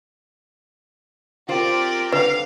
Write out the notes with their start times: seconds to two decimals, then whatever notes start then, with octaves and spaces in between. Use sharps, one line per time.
1.49 C4 F4 G4 A#4 C5 D5
2.13 D3 B4 F5